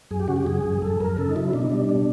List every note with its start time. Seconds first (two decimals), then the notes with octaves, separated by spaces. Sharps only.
0.11 F#2 G#4
0.20 G4
0.28 C#3 F#4
0.36 G4
0.46 F#2 G#4
0.64 F#2
0.82 F#2 A4
1.00 F#2 A#4
1.17 C#3 A4
1.29 D#4
1.36 F#3 E4
1.53 B2 D4
1.62 D#4
1.70 G3 D4
1.89 B2 D4